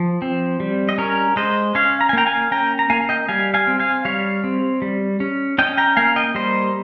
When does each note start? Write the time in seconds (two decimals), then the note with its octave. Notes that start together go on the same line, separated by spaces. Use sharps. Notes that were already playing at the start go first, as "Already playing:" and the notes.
Already playing: F3
0.22 C4
0.60 G3
0.89 D#5
0.98 C#4 A#4 C#5
1.36 G#3 C5 D#5
1.75 C#4 C#5 F5
2.01 A#5
2.09 G#5
2.13 A#3 G5 A#5
2.26 F5 G#5
2.51 C#4 G5 A#5
2.79 A#5
2.90 A#3 F5 G#5
3.09 D#5 G5
3.28 G3 F5 G#5
3.54 F5 G#5
3.67 C4
3.80 F5 G#5
4.05 G3 C#5 F5
4.44 C4
4.82 G3
5.20 C#4
5.58 C#4 D#5 G5
5.78 G5 A#5
5.97 A#3 F5 G#5
6.16 D#5 G5
6.35 G3 C5 D#5